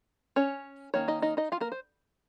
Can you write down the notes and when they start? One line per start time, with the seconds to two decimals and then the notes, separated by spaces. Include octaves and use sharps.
0.36 C#4 C#5
0.94 D#3 A#3 C#4 C#5
1.08 D#4 D#5
1.22 D#4 D#5
1.37 D#4 D#5
1.52 F4 F5
1.60 A#3 A#4
1.72 C5